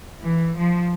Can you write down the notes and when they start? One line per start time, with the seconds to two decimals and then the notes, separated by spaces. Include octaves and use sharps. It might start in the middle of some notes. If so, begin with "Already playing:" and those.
0.24 E3
0.57 F3